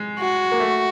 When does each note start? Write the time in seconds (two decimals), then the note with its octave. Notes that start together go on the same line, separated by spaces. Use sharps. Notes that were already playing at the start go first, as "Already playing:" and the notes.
Already playing: G#3
0.19 F#4
0.52 A#3
0.60 A3